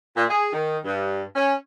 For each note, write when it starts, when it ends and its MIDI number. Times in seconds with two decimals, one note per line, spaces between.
0.17 0.26 46
0.29 0.50 68
0.52 0.78 51
0.85 1.24 43
1.35 1.53 61